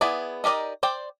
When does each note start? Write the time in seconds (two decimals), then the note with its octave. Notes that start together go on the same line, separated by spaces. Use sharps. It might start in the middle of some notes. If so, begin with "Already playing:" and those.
0.01 B3 E4 G#4 D5
0.44 D#4 G4 A#4 D5 D#5
0.83 C5 D5 G5